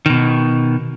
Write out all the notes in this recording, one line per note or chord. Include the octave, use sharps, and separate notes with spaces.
B2 D#3